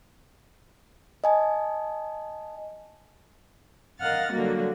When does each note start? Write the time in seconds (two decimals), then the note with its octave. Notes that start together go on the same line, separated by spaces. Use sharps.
1.24 D#5 G#5 A5
3.99 A#4 D#5 F5 F#5 F6 A6
4.31 D3 F#3 G3 A#3 F#4